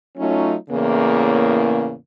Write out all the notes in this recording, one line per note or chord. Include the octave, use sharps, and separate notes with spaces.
F#3 A3 C#4 D#4 F4
E2 A2 C#3 A#3